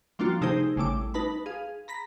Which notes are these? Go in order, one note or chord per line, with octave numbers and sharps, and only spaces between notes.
F3 G3 A#3 D4 F4 F#4
C3 A3 D#4 G4 G#4 C5
A1 C#3 G3 A3 D6
D#4 B4 A5 B5
G#4 F5
A#5 B5 A#6 B6